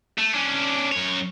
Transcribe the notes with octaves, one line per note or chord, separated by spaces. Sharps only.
A3
C#4 D4
F#2 C#5